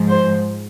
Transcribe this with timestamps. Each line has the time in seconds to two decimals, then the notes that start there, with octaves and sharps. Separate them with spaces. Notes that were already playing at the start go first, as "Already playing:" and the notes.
Already playing: G#2 F3 G#3
0.09 C5